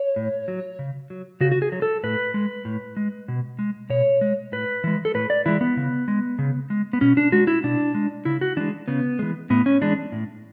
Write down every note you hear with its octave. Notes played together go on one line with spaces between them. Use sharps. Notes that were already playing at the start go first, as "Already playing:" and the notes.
Already playing: C#5
A2
F#3
C#3
F#3
C#3 F#4
F#4
G#4
F#3
A4
A2 B4
G#3
A2
G#3
B2
G#3
B2 C#5
G#3
A2 B4
E3 G#3
A4
A2 B4
D5
E3 G#3 E4
B3
C#3
G#3
C#3
G#3
B3
B2 C#4
D4
G#3 F#4
E4
B2 D4
G#3
C#3 E4
F#4
E3 G#3 D4
C#3 B3
E3 G#3
A2 B3
C#4
E3 G#3 D4
A2